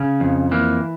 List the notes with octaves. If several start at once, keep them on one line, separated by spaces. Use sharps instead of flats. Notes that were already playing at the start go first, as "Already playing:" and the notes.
Already playing: C#3 C#4
F2
E3 A#3